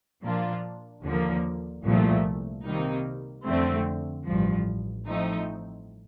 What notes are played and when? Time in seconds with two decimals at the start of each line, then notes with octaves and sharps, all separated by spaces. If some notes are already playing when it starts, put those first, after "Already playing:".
0.23 A#2 F3 A#3 D4 F4
1.03 D#2 D3 F3 A#3
1.84 C2 A#2 F3 A3
2.65 C3 D#3 G3 A#3 D#4
3.46 F2 D3 A3 C4
4.27 A1 G2 F3
5.07 A2 F3 A3 C4 D#4